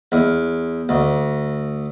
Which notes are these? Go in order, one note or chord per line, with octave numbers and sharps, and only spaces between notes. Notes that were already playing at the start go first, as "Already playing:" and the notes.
E2
D2